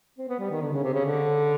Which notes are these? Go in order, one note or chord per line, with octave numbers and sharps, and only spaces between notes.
C4
B3
G3
D#3
D3
C#3
C3
C#3
D3